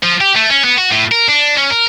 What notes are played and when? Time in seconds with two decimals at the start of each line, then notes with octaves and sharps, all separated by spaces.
0.03 F3
0.21 G4
0.36 A3
0.50 C#4
0.65 B3
0.78 F#4
0.92 A2
1.12 A#4
1.28 D4
1.57 C#4
1.70 A#4